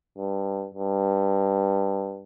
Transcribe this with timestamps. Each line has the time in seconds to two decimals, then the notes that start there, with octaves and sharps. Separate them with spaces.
0.18 G2
0.74 G2